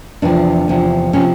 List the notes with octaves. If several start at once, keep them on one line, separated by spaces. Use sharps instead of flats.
E2 C3 F3 D4
E2 C3 F3
C3 F3 C#4